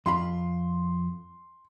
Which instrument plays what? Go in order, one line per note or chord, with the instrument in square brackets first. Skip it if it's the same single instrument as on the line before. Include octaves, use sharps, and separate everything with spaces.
[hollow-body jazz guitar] F2 F4 B5 [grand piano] C6